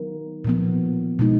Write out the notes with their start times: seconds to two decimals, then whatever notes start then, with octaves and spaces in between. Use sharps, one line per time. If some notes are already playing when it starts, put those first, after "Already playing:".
Already playing: D#3 F#3 B3 D#4 A#4
0.44 A#2 F3 B3
1.19 B2 G#3 D#4